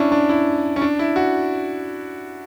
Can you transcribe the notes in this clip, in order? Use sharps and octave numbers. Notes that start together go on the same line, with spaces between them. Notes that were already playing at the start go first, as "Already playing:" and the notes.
Already playing: C#4 D4 E4
D4
E4
C#4
D4
E4
F#4